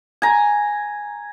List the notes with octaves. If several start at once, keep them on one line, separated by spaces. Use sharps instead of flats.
G#5 A#5